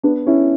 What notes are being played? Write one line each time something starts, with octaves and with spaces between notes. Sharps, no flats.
B3 D4
C#4 E4